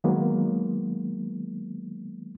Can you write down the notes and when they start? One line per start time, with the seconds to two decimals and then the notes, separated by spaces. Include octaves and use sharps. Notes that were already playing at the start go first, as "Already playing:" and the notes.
0.04 D#3 F#3 G#3 A#3 B3